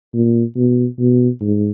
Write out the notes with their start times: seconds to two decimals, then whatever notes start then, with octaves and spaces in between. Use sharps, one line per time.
0.14 A#2
0.56 B2
0.99 B2
1.41 G#2